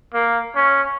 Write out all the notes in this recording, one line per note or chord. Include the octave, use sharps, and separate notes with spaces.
A#3
C#4